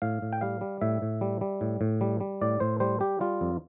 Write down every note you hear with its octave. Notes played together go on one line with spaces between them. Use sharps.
A2 F5
A2
G5
G3 F5
G3
A2 E5
A2
G3
G3
A2
A2
G3
G3
A2 D5
A2 C5
G3 C5
G3 G4
G3 F4
F2